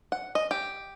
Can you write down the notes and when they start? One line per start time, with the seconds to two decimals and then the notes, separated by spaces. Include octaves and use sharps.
0.12 F#5
0.35 D#5
0.51 G4